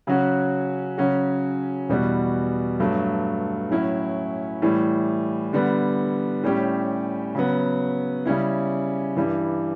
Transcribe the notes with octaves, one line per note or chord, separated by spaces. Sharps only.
C#3 F#3 C#4 F#4
C#3 F#3 C#4 F#4
E2 B2 G3 B3 F#4
G2 F#3 A3
A2 F#3 C#4 E4
A2 E3 G3
D3 G3 B3
A2 G3 C#4 G4
C#3 F#3 B3
C#3 G3 C#4 E4
G2 E3 G3